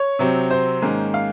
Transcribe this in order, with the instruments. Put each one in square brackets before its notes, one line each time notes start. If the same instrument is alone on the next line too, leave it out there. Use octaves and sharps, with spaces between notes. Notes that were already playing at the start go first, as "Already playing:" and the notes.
Already playing: [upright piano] C#5
C3 F#3 C4
C5
G#2 D#3 A#3 C#4
F5